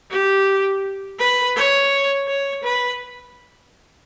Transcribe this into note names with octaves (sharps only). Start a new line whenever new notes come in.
G4
B4
C#5
C#5
B4